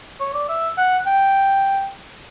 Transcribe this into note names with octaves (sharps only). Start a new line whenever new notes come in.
C#5
D5
E5
F#5
G5